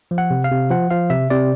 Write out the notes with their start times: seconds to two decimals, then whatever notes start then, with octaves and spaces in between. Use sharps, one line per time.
0.11 F3
0.18 F#5
0.31 C3
0.44 F5
0.51 C3
0.70 F3 F#5
0.91 F3 F5
1.10 C3 E5
1.30 C3 D5